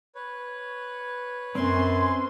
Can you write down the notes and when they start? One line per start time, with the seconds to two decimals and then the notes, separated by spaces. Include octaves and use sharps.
0.15 B4 C#5
1.55 F#2 C4 C#4 G#5 C6